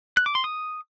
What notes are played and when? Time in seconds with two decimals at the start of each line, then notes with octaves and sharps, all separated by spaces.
0.17 F#6
0.26 D6
0.35 C6
0.44 D#6